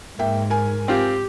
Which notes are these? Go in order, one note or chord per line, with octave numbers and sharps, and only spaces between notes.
G#2 A#3 E5 G5
A#4 G#5
C4 F4 G4